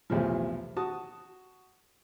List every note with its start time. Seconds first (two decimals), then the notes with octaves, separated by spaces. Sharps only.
0.10 B1 E2 A2 C3 F3
0.77 F#4 A5 D#6